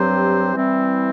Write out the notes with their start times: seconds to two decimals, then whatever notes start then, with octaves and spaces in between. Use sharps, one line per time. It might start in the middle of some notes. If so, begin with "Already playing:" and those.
Already playing: G2 F#3 C4 G4 C5
0.54 E3 G3 C4 E4